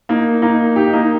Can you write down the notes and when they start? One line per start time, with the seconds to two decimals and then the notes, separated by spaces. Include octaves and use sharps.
0.09 A#3 D#4
0.42 A#3 D#4
0.76 D#4 G4
0.93 A#3 D#4